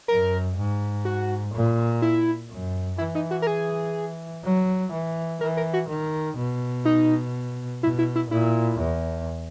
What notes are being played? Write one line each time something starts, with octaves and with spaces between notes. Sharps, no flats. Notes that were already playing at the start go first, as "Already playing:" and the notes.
F#2 A#4
G#2
F#4
A#2
E4
F#2
E3 E4
D#4
F#4
A#4
G#4
F#3
E3
E3 A#4
A#4
F#4
D#3
B2
D#4
B2 E4
E4
E4
A#2 E4
E2